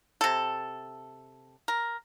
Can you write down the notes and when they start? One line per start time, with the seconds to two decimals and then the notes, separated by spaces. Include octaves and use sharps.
0.21 C3 A4
1.68 A#4